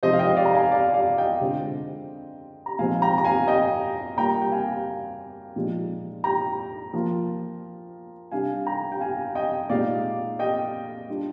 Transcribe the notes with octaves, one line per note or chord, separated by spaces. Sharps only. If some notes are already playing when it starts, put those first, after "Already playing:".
C3 F3 G#3 D#4 C5 D#5
F5
D#5 G5
D5 F5
A#5
F5 G#5
D5 F5
D5 F5
D#5 G5
D3 G#3 C4 F4
A#5
A#2 F3 G#3 C4 D#4 F5 G#5
G5 A#5
A#5
F5 G#5
D#5 G5
G3 A#3 F4 G5 A#5
G5
F5 G#5
A#2 F3 G#3 D#4
G5 A#5
F3 A#3 F4
C3 G3 D4 F5 G#5
G5 A#5
G5
F5 G#5
D#5 G5
A#2 G#3 D#4 D5 F5
D#5 G5
G3 D4 F4